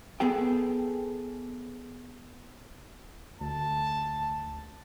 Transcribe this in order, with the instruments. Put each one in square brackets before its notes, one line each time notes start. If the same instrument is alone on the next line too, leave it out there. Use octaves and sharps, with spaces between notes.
[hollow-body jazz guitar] B3 G#4 A4 G5
[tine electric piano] D2 [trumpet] A5